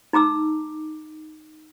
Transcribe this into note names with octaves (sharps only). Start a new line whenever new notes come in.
D#4 A#5 D6 E6